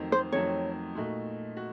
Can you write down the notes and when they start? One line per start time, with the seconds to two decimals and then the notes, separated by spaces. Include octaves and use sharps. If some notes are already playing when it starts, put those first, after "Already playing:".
Already playing: F2 D#3 F#3 A3 C4
0.12 C5
0.32 F2 D#3 F#3 A3 C4 C#5
0.95 A#2 A3 D#4 F#4
1.57 F#4